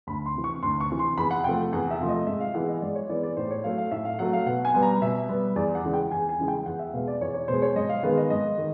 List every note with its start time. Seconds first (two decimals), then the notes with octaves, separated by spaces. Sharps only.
0.07 D2 B5
0.26 C6
0.35 C3 E3
0.44 C#6
0.63 D2 C6
0.81 C#6
0.90 C3 E3
0.99 C6
1.17 E2 B5
1.31 F#5
1.44 C3 F3 A3 G5
1.73 E2 F#5
1.91 E5
2.00 C3 F3 A3
2.09 D#5
2.27 G#2 E5
2.40 F5
2.54 E3 G#3 B3 F#5
2.68 D#5
2.82 G#2 D5
2.95 C#5
3.09 E3 G#3 B3 D5
3.23 D5
3.37 A2 C5
3.51 C#5
3.64 F#3 A3 F5
3.78 F5
3.91 A2 E5
4.05 F5
4.19 F#3 A3 F#5
4.33 F5
4.46 B2 F#5
4.65 G#5
4.74 G3 B3
4.83 A#5
5.01 B2 E5
5.29 G3 B3
5.56 E2 D5
5.75 F#5
5.84 C#3 E3 G#3
5.93 G5
6.11 E2 G#5
6.29 G#5
6.39 C#3 E3 G#3
6.48 G5
6.66 E2 F#5
6.79 E5
6.93 B2 G#3 F5
7.08 D5
7.21 E2 C#5
7.34 C#5
7.48 B2 G#3 C5
7.62 C#5
7.76 G#2 D#5
7.89 F5
8.03 D#3 G#3 B3 F5
8.18 D#5
8.30 G#2 D#5
8.58 D#3